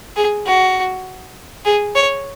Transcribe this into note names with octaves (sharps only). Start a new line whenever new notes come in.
G#4
F#4
G#4
C#5